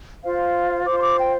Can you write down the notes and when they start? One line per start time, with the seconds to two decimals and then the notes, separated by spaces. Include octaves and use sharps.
0.22 F4 C5 F5
0.85 F4 C5 D6
0.97 C6
1.01 D6
1.18 G5